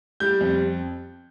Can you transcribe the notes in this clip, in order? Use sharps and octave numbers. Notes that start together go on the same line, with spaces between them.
G3 G6
F2